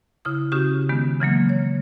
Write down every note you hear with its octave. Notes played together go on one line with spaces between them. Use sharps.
C#3 E4 D#6
C#3 C#4 F#4 G4 D#6
D#3 G#3 B3
C#3 E3 F#3 A#3
C#5